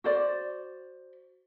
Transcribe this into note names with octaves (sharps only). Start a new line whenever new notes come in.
F#4 C5 D5